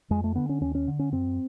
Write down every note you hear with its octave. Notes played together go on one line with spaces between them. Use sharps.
F2 G#3
A3
D3 B3
C#4
D#2 C#4
C#4
D3
C#4
F#2 C4